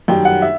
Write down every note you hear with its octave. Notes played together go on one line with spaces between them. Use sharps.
F#2 D#3 G3 G5
F#5
E5